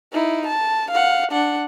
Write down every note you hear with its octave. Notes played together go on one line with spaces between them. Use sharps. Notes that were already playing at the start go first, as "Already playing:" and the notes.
D#4 E4
A5
F5 F#5
D4 F#5